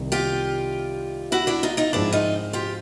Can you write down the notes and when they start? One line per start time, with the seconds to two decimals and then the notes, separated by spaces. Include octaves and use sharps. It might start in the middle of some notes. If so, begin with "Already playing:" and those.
Already playing: C2 C3 D#3
0.12 F4 G4
1.32 E4 F#4
1.47 D4 E4
1.63 D#4 F4
1.77 D#4 F4
1.93 G#2 F3 G#3 C4 D4 E4
2.12 D#4 F4
2.53 F4 G4